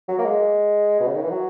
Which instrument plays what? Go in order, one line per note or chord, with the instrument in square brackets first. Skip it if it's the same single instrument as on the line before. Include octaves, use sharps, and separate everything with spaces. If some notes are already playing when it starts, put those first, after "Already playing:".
[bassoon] F#3
A#3
G#3
B2
C#3
D#3
E3
F#3